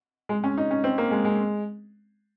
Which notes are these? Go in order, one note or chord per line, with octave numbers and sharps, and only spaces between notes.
G#3
C#4
D#4
C#4
C4
A#3
G#3
G#3